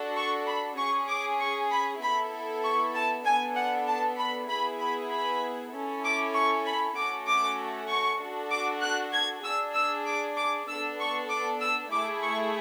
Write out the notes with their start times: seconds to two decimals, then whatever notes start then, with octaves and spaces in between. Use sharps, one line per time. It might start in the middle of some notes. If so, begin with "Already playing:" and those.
Already playing: D4 F#4 A4
0.16 C#6
0.47 B5
0.77 C#4 G#4 C#6
1.09 D6
1.39 C#6
1.71 B5
2.01 B3 E4 A4 B5
2.64 C#6
2.94 A5
3.25 B3 D4 A4 G#5
3.56 F#5
3.87 A5
4.18 B5
4.49 B3 E4 G#4 B5
4.80 B5
5.11 B5
5.73 C#4 E4 A4
6.04 D6
6.34 C#6
6.66 B5
6.96 A3 C#4 F#4 A4 D6
7.27 D6
7.89 C#6
8.20 D4 F#4 A4
8.51 D6
8.82 F#6
9.13 G#6
9.44 D4 G#4 E6
9.74 E6
10.06 D6
10.37 D6
10.68 B3 D4 A4 E6
10.99 C#6
11.30 D6
11.61 E6
11.91 A3 E4 G#4 D6
12.22 C#6